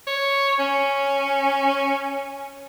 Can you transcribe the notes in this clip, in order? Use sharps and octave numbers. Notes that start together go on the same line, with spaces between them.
C#5
C#4